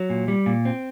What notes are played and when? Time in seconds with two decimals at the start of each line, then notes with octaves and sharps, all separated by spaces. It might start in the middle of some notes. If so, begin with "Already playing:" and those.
Already playing: F#3
0.10 A#2
0.28 G3
0.46 A#2
0.65 C4